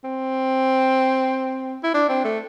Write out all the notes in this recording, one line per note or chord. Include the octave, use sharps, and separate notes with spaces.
C4
E4
D4
C4
A3